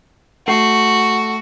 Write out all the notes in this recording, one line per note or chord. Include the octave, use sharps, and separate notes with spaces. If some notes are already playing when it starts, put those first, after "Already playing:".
A3 F#4 C7